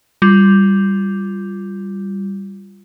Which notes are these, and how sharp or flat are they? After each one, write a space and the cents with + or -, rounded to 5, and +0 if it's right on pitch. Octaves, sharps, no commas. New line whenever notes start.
G3 +0 F4 +0